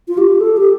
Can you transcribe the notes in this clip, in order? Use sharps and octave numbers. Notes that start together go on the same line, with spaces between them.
F4
G4
A4
G4